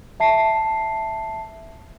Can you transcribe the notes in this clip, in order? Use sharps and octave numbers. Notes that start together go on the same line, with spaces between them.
E5 A5 C7